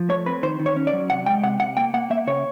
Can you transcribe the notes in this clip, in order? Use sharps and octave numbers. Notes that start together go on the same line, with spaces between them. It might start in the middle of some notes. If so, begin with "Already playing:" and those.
Already playing: F3
A3 C#5
C4 B4
D#3 C5
D#3
C#5
C#4
D5
F#3
C3 F#5
G#3 G5
C3 F#5
C3 F#5
A#3 G5
A#3 F#5
A#3 E5
C#3 C#5